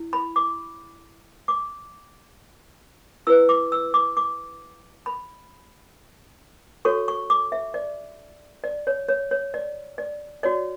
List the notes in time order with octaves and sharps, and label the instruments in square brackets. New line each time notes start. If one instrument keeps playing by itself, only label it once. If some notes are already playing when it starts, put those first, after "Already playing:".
Already playing: [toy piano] E4
B5
D6
D6
E4 B4 E6
D6
E6
D6
D6
B5
F#4 A4 C#5 C#6
C#6
D6
E5
D5
D5
C#5
C#5
C#5
D5
D5
F#4 C#5 D5